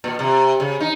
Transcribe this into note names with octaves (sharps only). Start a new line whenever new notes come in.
A#2
C3
C#3
D#4